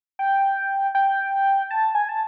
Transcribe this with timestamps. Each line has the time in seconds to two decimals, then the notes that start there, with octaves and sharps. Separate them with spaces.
0.19 G5
0.95 G5
1.70 A5
1.95 G#5
2.09 A5